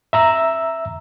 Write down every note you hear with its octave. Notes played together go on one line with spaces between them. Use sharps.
E5 A#5 E6